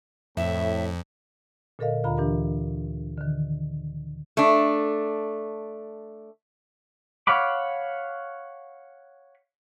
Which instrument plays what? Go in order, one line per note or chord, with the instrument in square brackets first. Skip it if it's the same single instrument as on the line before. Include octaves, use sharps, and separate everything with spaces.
[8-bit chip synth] F2 [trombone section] A2 [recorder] E5
[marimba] A#2 D3 A4 A#4 D#5 F5
D2 D3 F4 F5 A#5 B5
E3 D4 G4 A#4
D3 D#3
[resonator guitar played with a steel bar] A3 D4
[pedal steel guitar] C#5 F5 F#5 B5 D6